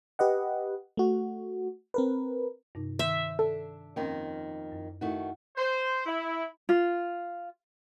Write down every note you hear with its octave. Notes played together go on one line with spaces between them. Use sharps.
G4 B4 D#5 F#5
A3 F#4
C4 A#4 B4
G2 C3 D#4
D#3 C5 E5
D4 A4
F2 D#3 A#3 C#4 A#4 G5
F#2
D#3 A3 D#4 E4 F#4
C5
E4
F4